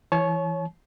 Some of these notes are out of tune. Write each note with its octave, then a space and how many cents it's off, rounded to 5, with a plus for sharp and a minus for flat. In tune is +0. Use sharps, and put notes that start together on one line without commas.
E3 +10 C#5 -5 A5 -45